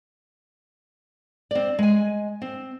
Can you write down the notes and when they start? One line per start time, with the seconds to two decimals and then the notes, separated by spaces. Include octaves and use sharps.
1.51 C4 D5
1.79 G#3 G#5
2.42 C4